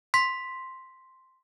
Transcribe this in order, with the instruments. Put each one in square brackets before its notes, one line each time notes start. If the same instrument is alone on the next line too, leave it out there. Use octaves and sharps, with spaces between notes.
[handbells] C6 B6